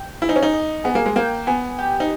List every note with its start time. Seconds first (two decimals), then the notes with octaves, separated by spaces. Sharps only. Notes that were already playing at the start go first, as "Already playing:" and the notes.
Already playing: G5
0.22 E4 G#4
0.29 D#4
0.36 C#4
0.43 D#4
0.53 D#5
0.84 B3 G#4
0.95 A#3
1.06 G#3
1.16 A#3 G5
1.47 B3 G#5
1.79 G4
2.00 D#4